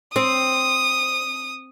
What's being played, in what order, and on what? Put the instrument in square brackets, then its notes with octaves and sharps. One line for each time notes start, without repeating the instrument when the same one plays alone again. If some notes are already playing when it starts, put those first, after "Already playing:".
[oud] C4 [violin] D#6